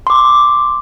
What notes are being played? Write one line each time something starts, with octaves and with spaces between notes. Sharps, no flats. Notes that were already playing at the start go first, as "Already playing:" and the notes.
C6 D6